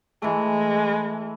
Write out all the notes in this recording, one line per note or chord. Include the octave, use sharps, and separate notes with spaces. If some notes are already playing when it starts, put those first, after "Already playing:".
E3 G#3 A3